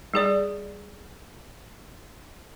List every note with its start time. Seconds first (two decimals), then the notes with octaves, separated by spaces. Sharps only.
0.14 G3 G#4 D5